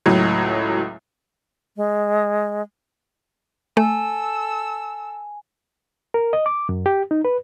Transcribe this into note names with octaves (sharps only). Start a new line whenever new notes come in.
C#2 A2 F#3
G#3
A3 A4 G#5 E6
A#4
D#5
D6
F#2
G4
D#4
B4